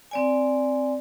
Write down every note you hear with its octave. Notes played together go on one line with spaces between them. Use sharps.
C4 D5 G#5